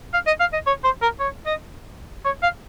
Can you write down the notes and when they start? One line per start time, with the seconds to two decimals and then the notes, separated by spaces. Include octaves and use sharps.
0.14 F5
0.27 D#5
0.40 F5
0.53 D#5
0.67 C#5
0.84 C5
1.02 A#4
1.20 C#5
1.46 D#5
2.25 C#5
2.43 F5